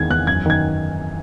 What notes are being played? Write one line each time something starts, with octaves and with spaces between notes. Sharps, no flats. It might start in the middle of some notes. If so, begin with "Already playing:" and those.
Already playing: E2 D#3 G#3 G#6
E2 F#6
F#2 G#6
D#3 G#6